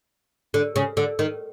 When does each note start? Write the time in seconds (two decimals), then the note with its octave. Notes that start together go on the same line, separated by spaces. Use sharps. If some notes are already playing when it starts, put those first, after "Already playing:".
0.54 D3
0.76 C#3
0.97 D3
1.19 D#3